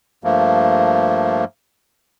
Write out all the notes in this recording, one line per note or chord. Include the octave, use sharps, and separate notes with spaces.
G2 F3 A3 A#3